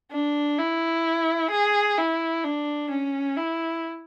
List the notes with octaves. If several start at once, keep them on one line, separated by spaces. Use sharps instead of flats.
D4
E4
G#4
E4
D4
C#4
E4